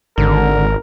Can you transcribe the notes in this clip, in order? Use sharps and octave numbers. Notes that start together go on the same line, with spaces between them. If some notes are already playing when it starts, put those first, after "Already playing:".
G#1 D3 A#4